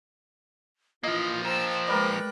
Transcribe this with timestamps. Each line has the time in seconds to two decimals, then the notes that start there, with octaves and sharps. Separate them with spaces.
1.03 E3 F3 A#3 F4 D#5
1.45 C5 G5 A5 A#5 E6
1.87 G#3 A#4 B4 D5 G5 F#6